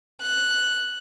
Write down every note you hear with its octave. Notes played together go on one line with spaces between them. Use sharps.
F#6